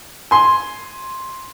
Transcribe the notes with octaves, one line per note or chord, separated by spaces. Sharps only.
G#5 C6